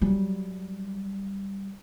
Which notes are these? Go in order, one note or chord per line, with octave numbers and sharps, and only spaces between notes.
F#3 G3